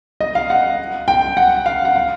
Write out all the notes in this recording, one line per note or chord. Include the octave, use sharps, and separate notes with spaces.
D#5
F5
F#5
G5
F#5
F5
F#5
F5